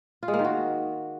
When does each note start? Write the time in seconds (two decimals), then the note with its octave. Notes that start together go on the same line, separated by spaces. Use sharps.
0.23 F4
0.28 G#3
0.34 A#3
0.39 D#3
0.44 F#4